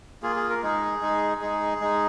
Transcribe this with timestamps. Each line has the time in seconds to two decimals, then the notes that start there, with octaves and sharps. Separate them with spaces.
0.23 A#3 F4 G#4
0.36 G#4
0.50 A#4
0.63 G#3 D#4 G#4
1.02 G#3 D#4
1.42 G#3 D#4 G#4
1.81 G#3 D#4